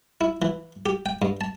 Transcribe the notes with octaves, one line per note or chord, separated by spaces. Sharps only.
E4
E3
G4
G5
G2
A5